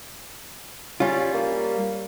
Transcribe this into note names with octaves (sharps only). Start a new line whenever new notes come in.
G3 C#4 F4
A#3